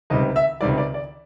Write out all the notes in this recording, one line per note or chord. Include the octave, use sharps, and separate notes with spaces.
C#2 C3 D#3 G3 D#5
E5
C#2 C3 D#3 G3 D5
D5
D5